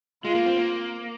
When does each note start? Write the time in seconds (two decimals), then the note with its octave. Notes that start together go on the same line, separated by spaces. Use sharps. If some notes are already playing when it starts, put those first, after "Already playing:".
0.25 G#3 F4
0.35 A#3
0.46 C4
0.57 A#3